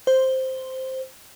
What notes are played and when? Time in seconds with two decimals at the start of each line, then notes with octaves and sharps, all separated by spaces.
0.07 C5